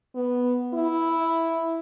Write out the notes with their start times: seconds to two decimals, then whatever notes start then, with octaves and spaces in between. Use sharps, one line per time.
0.15 B3
0.74 E4